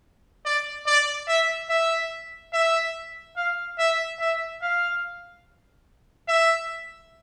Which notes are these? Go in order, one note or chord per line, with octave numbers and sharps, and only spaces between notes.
D5
D5
E5
E5
E5
F5
E5
E5
F5
E5